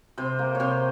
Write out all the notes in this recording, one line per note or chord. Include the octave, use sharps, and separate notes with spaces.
C3 C5
A#3
C#5
C3 C5